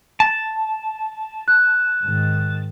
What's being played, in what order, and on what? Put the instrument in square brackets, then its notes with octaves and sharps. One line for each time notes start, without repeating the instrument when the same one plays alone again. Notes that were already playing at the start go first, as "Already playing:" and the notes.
[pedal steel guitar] A5
[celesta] F#6
[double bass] G#2 D#3